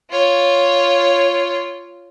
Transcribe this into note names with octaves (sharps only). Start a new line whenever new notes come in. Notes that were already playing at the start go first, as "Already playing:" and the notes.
F4 C#5